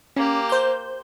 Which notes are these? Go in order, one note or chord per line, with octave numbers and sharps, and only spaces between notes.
A#3 C#4 G4
C5 G6